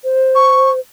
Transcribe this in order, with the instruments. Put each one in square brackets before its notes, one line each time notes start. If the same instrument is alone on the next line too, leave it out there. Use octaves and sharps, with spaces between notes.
[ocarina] C5
[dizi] C#6